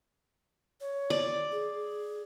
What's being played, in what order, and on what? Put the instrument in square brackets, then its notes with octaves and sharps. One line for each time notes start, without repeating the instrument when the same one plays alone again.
[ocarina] C#5
[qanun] D5
[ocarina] G#4